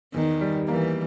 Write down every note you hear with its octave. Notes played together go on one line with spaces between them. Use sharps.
E2 D#3
G3
E3 A#3